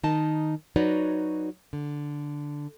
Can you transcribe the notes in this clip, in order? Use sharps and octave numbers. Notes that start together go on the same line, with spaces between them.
D#3 D#4 D#5 A5
F#3 D#4 F#4 B4 C#5 D5
D3